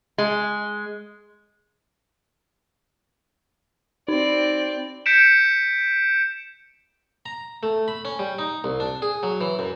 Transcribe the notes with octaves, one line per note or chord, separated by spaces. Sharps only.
G#3
C4 D#4 D5
G6 B6 C#7 D7 E7
A#5
A3
B5
C#4
G3
D#4
C2
D4
G#4
F#3
E3
F#2